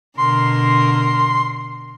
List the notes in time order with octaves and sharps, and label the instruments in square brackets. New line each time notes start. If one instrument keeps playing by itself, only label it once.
[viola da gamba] B2 D3 A#4 [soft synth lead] C6